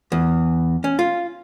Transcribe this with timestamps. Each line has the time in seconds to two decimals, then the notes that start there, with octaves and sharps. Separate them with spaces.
0.12 E2
0.84 C#4
0.99 F4